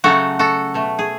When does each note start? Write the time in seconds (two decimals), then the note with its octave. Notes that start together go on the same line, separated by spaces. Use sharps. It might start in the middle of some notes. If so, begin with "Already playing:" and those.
0.04 C#3 F#3 A3 F#4 A4
0.39 F#4 A4
0.74 B2 A3
0.99 G#4